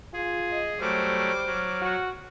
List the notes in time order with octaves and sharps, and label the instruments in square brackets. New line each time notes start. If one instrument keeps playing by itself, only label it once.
[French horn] F4 [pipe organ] G#4
[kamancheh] D#5
[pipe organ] F#3 A3 [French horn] G3 [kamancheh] C5 D6 [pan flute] F6
[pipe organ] F#3
[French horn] F#4